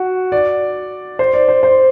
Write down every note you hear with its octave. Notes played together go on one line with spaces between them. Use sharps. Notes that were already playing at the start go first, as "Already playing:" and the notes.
Already playing: F#4
D5
C5
D5
C5
C5